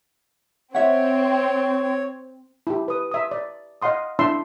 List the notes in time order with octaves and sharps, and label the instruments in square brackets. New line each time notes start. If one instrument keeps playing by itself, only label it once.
[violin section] C4 [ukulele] E4 E5 F#5 [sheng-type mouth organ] C#5
[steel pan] E4 G4
B4 D#6
E5 D#6
D5
D#5 F5 F#5 C6 D#6
D4 E4 E5 C6 E6